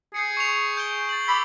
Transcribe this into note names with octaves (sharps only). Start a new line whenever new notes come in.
G#4 G6 C7 C#7
C#6 C#7 F7
G6 D7 G7
A6 F#7
B5 D6 E6